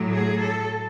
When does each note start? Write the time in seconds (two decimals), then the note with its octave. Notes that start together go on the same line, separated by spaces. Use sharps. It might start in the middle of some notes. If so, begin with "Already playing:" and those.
Already playing: A2 F#3
0.11 G#4
0.41 A4